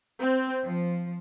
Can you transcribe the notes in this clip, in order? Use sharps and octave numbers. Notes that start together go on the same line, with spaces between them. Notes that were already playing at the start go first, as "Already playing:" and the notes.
C4
F3